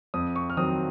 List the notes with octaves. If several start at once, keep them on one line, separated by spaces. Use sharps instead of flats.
F2 D#6
C#6
F6
D#3 F#3 C4 D#6